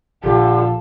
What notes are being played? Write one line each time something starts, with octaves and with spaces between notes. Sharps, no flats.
A#1 D3 F4 G4 A4